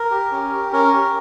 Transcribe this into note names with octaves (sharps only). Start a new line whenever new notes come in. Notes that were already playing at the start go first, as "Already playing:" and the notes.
Already playing: A#4
G4
C#4
G4
C#4 A#4
G4